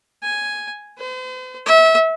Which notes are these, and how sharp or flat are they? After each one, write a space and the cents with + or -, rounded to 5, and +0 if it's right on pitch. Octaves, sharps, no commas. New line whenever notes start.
G#5 +0
C5 -45
E5 -30